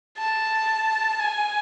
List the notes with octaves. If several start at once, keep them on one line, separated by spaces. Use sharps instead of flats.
A5
G#5